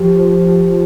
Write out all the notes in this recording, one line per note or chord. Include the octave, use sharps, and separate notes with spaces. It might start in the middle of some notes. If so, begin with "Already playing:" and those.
Already playing: F3 G4
C5
G4